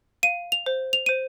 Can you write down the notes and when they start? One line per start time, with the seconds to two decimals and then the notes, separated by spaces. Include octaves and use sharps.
0.23 F5 D#7
0.52 F7
0.66 C5
0.93 F7
1.06 C5 D#7